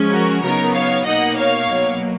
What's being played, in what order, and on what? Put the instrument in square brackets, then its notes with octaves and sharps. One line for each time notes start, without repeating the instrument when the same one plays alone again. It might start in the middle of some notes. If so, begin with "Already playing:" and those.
Already playing: [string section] F3 G#3 C#4
F#4 A#4
C#3 F#3 B3 D#4 A#4 C#5
C#5 F5
B2 A#3 D#4 D#5 F#5
C#5 F5
B2 F#3 A#3